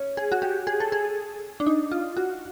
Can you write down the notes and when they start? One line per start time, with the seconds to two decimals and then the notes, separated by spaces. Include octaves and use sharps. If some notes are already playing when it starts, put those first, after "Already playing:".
Already playing: C#4
0.17 G#4
0.32 F#4
0.42 G4
0.67 G#4
0.80 A4
0.92 G#4
1.60 D4
1.66 D#4
1.91 F4
2.17 F#4